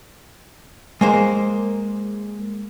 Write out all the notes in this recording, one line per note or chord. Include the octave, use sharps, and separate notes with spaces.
G#3 A#3 C5